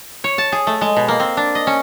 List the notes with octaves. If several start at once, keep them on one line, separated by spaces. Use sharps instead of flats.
C#5
A5
G#4
A3
G#3
B2
A#3
C4
D4
D#5
C#4